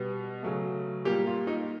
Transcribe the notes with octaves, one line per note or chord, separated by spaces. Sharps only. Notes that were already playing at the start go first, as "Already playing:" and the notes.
Already playing: B2 G3 B3
C#3 F#3 A3
A#2 G3 A#3 G4
F4
D#4